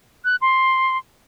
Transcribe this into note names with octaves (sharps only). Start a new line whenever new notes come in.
F#6
C6